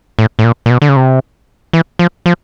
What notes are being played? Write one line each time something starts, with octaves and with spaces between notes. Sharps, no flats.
A2
A2
A#2
A#2
B2
D3
C#3
C3
E3
F3
F3